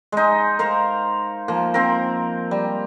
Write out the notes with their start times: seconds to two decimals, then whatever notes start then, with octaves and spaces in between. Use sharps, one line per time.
0.12 G#3 D#4
0.59 A#4 C5 F5
1.48 F3 A#3
1.74 C4 A#4
2.51 G3